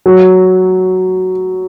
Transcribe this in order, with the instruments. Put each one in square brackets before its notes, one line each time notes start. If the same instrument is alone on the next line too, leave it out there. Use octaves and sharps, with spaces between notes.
[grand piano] F#3